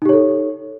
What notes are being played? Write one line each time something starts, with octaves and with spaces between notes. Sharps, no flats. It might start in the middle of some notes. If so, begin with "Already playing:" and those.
D#4 G4 A4 C#5